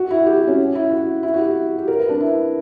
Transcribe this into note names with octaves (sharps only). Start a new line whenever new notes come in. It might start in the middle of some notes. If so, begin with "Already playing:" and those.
Already playing: F#4
E4
G4
F#4
C#4
E4
F#4
E4
F#4
G4
G4
A#4
B4
D4
E4